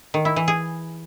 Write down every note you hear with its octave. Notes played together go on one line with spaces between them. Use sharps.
D#3
E4
E3
G#4